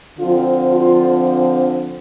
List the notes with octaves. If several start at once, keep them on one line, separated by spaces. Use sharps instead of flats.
D3 F3 C4 F4
F4